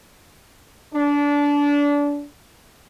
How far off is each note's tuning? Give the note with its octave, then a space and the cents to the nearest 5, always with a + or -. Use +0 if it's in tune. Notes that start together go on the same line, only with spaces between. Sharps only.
D4 -25